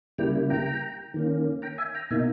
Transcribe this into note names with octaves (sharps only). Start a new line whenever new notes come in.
C#3 G3 A#3 E4 G5 A#5
G5 A#5
D#3 A#3 C#4
G5 A#5
E5 G#5
G5 A#5
B2 A#3 D#4 E5 G#5